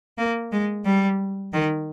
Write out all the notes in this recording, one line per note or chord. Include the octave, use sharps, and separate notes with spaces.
A#3
G#3
G3
D#3